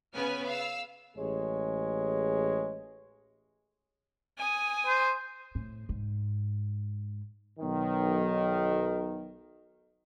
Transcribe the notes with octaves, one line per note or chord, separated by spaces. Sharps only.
C#3 B3 B4 G#5 F6
F5 E6
A1 G#3 G#4 C#5
G#5 D#6
C5
A2
G#2
B1 D#3